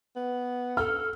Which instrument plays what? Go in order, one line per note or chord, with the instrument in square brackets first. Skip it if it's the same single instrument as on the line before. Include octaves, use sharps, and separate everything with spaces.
[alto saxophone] B3
[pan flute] A4 [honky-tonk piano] F6